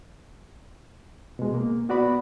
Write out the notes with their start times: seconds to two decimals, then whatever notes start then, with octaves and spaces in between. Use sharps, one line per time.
1.39 B2 G#3
1.54 A#3
1.89 B3 F#4 D5 B5